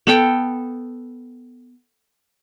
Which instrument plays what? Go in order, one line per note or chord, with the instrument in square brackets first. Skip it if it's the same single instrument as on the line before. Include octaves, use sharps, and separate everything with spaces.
[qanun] B3 A4 G5